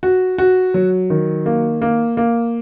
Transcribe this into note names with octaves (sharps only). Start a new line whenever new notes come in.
F#4
F#4
F#3
D#3
A#3
A#3
A#3